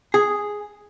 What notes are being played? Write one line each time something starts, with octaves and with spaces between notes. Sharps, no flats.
G#4